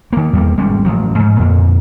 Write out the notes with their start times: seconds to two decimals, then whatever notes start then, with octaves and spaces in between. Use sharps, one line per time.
0.13 D#3 A#3
0.33 E2 G3 A#3
0.58 G#1 G3 G#3 C#4
0.85 A1 A2 F3 F#3
1.19 G#2
1.39 F2 A#2